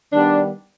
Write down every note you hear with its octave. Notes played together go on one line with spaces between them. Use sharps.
D#3 G3 B3 D4